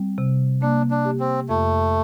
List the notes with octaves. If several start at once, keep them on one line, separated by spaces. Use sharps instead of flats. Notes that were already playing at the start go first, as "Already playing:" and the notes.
Already playing: G3 C4
C3
A#3 D4
D4
G4
C4
F2 A3